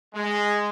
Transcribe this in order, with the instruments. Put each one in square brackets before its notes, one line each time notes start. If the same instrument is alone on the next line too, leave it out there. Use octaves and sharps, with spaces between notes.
[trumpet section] G#3